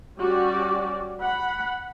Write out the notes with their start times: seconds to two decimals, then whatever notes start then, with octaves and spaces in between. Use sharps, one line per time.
0.18 G3 C#4 F#4 G4 D5
1.21 F#5 B5